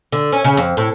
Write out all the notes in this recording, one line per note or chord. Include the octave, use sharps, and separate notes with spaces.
D3
C#4
C#3
F2
A2